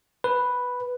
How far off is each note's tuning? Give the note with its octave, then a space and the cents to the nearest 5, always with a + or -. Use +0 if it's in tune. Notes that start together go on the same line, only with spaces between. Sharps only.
B4 +0